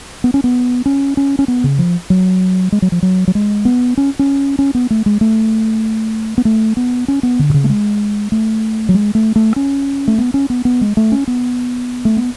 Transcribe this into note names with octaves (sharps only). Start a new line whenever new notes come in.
B3
C#4
B3
C#4
C#4
C#4
B3
C#3
F3
F#3
G#3
F#3
F3
F#3
F#3
G#3
B3
C#4
C#4
C#4
B3
A3
G#3
A3
B3
A3
B3
C#4
B3
D3
B2
C#3
A3
G#3
A3
F#3
G#3
A3
A3
C#4
A3
B3
C#4
B3
B3
G#3
A3
C#4
B3
A3
B3